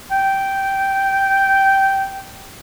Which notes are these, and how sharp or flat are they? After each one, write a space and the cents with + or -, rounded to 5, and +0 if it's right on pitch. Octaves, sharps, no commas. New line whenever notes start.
G5 -10